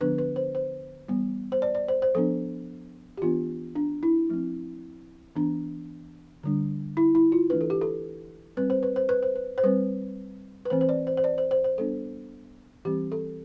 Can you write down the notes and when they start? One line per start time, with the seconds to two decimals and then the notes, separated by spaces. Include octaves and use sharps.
0.01 D3 F3 B3 D4 B4
0.18 B4
0.36 C5
0.55 C5
1.08 E3 G3 B3
1.52 C5
1.62 D5
1.75 D5
1.88 C5
2.02 C5
2.15 F3 B3 D4 A4
3.17 G4
3.22 E3 B3 D4 F4
3.76 D4
4.03 E4
4.29 F3 A3 C4
5.36 E3 B3 D4
6.43 D3 G3 D4
6.97 E4
7.15 E4
7.32 F4
7.50 E3 A3 D4 B4
7.61 A4
7.70 G4
7.81 A4
8.57 G3 C4 B4
8.70 C5
8.83 B4
8.96 C5
9.09 B4
9.23 C5
9.36 B4
9.58 C5
9.64 G3 C4 B4
10.65 B4
10.70 E3 A3 C4 C5
10.81 C5
10.89 D5
11.07 C5
11.17 C5
11.24 D5
11.38 C5
11.51 C5
11.64 C5
11.78 G3 B3 D4 A4
12.85 E3 G3 C4 G4
13.12 A4